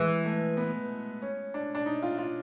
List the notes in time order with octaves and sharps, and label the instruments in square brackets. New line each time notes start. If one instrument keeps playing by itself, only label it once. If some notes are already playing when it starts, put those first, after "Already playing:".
Already playing: [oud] E3 [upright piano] G#3
[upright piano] A3
B3
C#4
D4
D4
D#4
F4
F4